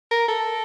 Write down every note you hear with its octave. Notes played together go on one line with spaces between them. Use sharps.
A#4
A4